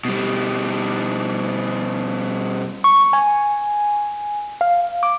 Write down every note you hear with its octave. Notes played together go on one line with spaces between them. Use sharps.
B2 G3
C#6
G#5
F5
D6